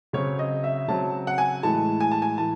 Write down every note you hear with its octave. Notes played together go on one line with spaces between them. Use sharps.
C#3 F#3 C4 C#5
D#5
E5
C#3 F#3 C4 A5
F#5
G#5
A2 E3 G#3 A5
G#5
A5
G#5
A2 E3 A5